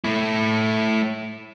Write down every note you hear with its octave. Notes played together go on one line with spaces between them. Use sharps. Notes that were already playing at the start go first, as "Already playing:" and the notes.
A3 E4